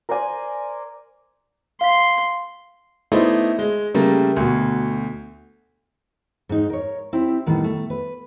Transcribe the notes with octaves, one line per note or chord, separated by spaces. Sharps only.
A#4 C5 D5 G#5
F5 C6 B6
A3 B3 D#4 E4 C5 D5
G#3
C#3 G3 A3 A#3 A#5
D2 B2
G#2 D#4
A#4 C#5
C4 E4 G4
A2 D#3 G3 B3
A3
B4